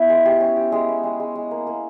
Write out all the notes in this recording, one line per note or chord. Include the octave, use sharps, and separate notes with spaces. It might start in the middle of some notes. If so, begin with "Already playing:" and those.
Already playing: B3 E4
G#3
G4
C#4
G4
G#3
B3
G#3
G#3
G#3
A#3
A#3